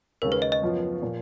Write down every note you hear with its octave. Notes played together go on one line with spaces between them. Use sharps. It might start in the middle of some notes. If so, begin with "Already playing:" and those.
D#2 C#3 G#3 A#4
B4
D#5
D#5
F#2 F3 B3 F4
A#2 F3